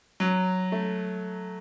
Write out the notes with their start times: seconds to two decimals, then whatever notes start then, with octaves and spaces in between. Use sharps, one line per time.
0.20 F#3
0.72 A3